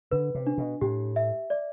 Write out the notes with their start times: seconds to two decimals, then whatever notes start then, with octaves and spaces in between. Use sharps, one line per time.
0.12 D3 B4
0.35 C3
0.47 D4
0.58 B2
0.81 A2 G4
1.16 E5
1.50 D5